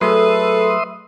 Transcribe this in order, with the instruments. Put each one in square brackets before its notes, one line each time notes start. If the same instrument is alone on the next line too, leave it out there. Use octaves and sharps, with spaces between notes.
[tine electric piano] F#3 A3 G#4 [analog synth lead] A4 [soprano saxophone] B4 [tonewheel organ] E5 C6 D#6